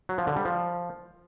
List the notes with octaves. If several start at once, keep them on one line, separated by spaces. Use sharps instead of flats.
F#3
F3
D3
G3
F3